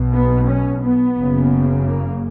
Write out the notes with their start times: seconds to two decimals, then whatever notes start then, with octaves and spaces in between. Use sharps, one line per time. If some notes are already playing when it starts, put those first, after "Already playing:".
Already playing: B1 B2
0.15 B3
0.49 C#4
0.84 B3
1.17 F#1 F#2 C#3
1.86 A#3